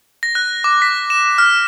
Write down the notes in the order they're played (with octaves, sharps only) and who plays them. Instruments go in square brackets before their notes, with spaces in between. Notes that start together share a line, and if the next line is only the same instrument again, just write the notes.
[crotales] A#6
F#6
D6
B6
E7
F6